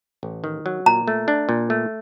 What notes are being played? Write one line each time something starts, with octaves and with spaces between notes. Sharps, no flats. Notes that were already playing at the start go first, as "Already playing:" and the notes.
A1
D#3
F#3
A#2 A#5
A3
D4
A#2
A3